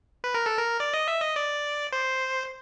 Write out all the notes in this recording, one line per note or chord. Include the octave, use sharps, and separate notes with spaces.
B4
A#4
A4
A#4
D5
D#5
E5
D#5
D5
C5